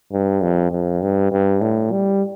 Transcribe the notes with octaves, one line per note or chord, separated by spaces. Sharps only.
G2
F2
F2
G2
G2
A2
G3